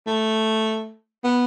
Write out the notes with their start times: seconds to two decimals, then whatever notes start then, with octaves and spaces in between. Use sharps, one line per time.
0.07 A3
1.24 B3